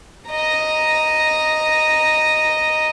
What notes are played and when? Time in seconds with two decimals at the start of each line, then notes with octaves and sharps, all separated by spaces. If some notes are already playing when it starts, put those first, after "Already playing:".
0.29 D#5 A#5